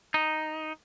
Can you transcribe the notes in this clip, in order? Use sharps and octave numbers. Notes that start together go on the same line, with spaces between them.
D#4